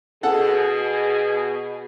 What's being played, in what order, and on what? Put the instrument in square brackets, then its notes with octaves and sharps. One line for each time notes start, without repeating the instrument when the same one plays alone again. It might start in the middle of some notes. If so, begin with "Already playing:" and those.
[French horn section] B2 G#4 [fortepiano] A4 F#5